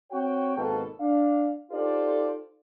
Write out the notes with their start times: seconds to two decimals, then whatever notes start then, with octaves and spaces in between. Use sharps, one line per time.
0.11 C4 F#4 C#5 G5
0.56 G#1 B2 A#3 A4
1.00 D4 F5
1.71 D#4 F4 G4 A4 C5 D5